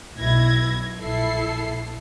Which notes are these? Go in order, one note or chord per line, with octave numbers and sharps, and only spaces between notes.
B1 B2 E4 G#6 A#6
A#1 E4 A4 C7